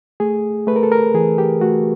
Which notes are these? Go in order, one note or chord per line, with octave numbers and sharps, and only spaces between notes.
A3 G#4
A3 B4
A#4
A4
A#4
E3 G#4
G4
A3 F#4